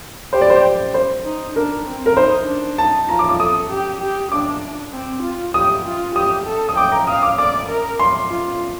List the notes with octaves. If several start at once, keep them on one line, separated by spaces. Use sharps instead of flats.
G4 C5
D5
C5
C5
D#4
D4 A#4
C4
A#4
D#4 C5
D4
D#4 A5
F4 A#5
D6
D6
A4 D#6
G4
G4
D4 D6
C4
F4
G4 D#6
F4
G4 D#6
A4
D#6
G5 D6
A#5
F5 D#6
D6
D5 D6
A#4
C6
F4